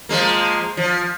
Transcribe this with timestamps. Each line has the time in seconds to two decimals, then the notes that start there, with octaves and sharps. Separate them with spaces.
0.09 F3 G#3 A#3
0.77 F3